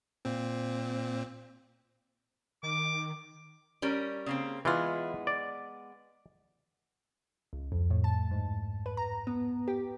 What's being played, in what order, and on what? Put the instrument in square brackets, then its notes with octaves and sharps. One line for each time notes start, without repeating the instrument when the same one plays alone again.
[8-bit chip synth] A#2 C4
[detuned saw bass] D#3 [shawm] D6
[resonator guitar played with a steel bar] G3 C#4 A#4
C#3 A#3 C4
[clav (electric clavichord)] E3 F4 [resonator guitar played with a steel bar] G#3 B3
[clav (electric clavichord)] D5
[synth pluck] C#2
F2
A2
A5
G#2
B4
A#5
B3
G4